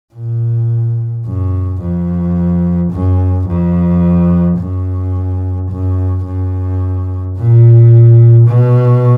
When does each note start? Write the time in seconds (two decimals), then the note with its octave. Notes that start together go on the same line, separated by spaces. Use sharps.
0.14 A#2
1.26 F#2
1.82 F2
2.92 F#2
3.47 F2
4.59 F#2
5.70 F#2
6.25 F#2
7.36 A#2
8.47 B2